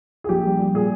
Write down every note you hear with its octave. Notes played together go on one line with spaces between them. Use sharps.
G#4
A#1 G4
G3
G3
A#2 G#4